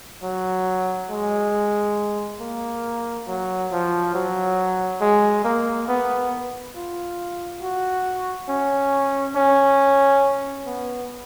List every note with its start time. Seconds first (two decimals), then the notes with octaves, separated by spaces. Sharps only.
0.23 F#3
1.10 G#3
2.40 A#3
3.27 F#3
3.72 F3
4.14 F#3
5.01 G#3
5.45 A#3
5.88 B3
6.75 F4
7.62 F#4
8.49 C#4
9.36 C#4
10.66 B3